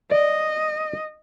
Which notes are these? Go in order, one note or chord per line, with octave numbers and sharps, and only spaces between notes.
D5 D#5